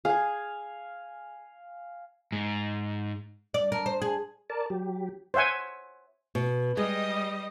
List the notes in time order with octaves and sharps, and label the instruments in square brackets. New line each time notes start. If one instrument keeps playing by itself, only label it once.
[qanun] G#4 [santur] F5 G#5
[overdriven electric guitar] G#2
[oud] D5
A#4
C5
G#4
[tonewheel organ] A#4 D5 A5
F#3 G4
[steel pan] C5 C#5 E5 F#5 G#5
[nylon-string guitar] B2
[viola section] G3 D#5 [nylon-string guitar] G#3